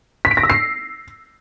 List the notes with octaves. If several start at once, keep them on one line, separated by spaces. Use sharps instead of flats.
B6
D7
A#6
E6
C7